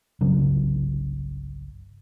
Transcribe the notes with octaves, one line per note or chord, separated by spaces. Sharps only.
G1 C2 C#3 F#3